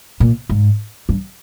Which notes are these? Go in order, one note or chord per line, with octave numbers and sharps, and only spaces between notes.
A#2
G#2
G2